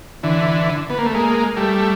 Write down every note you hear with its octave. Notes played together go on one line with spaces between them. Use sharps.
D3 E3
B3
A#3
A3
G#3 A#3
G3 A3